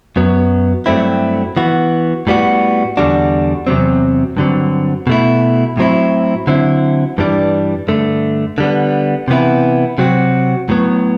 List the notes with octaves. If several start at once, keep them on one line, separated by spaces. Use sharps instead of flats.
F#2 F#3 B3
G2 F#3 A3 C4 E4
E3 B3 F#4
A2 G3 B3 F#4
E2 D3 G3 D4 F#4
E2 C3 F#3 C4
G2 D3 F#3 C4
B2 A3 E4
A2 F#3 C4 E4
D3 F#3 C4 E4
G2 E3 G3 D4
G2 D3 A3
D3 G3 B3
C3 E3 B3 E4
C3 F#3 C4 F#4
A2 F#3 B3